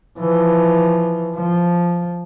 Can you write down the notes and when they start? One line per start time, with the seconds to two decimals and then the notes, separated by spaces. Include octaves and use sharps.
0.20 E3 F3
1.36 F3